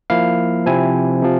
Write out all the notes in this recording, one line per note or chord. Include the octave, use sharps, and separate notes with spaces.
F3 A#3 E4 F5
C3 F3 C4 E4 G#5
C3 F3